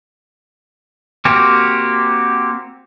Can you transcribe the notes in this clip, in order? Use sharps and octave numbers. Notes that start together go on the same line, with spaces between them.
A#3 C4 F#4 G4